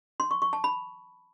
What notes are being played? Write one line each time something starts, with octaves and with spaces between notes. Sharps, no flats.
C6
C#6
C#6
A5
B5